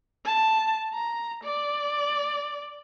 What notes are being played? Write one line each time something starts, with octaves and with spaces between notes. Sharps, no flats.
A5
A#5
D5